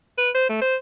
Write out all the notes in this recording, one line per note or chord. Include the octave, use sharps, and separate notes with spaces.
B4
C5
A3
C5